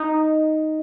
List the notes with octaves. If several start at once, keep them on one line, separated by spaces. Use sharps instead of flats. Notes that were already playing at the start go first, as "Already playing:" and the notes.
Already playing: D#4